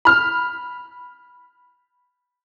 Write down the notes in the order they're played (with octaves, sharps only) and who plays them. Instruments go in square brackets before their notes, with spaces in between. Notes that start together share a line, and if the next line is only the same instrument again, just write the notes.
[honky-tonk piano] B5 F6